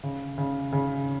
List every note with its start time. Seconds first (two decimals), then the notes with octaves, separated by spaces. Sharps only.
0.03 C#3
0.38 C#3
0.72 C#3